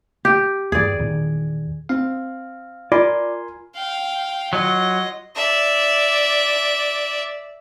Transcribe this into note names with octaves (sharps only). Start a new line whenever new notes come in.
G4
E2 G2 E3 G#4 D5
E2 A#2 D#3
C4 F5
F4 A#4 D5 G#5 C6
F5 G5
F#3 F4 D#5
D5 E5